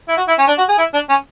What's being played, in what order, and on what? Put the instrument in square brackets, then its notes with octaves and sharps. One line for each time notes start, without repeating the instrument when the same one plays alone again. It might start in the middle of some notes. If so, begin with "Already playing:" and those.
[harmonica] E4
F#4
E4
C#4
D4
F#4
G#4
E4
D4
C#4